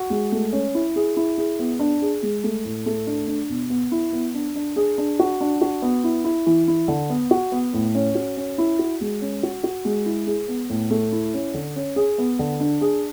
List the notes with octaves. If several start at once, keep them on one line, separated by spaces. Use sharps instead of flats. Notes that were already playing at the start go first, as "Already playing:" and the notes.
Already playing: F#4
G#3
A3
C#4
E4
G#4
E4
G#4
B3
D4
G#4
G#3
A3
A2
A3
D4
D4
B2
B3
E4
B3
D4
D4
G#4
D4
F#4
D4
F#4
B3
E4
E4
E3
E4
D3
B3
F#4
B3
A2
C#4
F#4
C#4
E4
F#4
G#3
C#4
F#4
F#4
G#3
E4
G#4
B3
A2
A3
E4
C#4
D3
C#4
G#4
B3
D3
D4
G#4